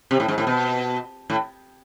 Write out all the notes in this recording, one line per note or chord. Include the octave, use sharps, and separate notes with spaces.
C3
A2
G#2
A2
B2
A2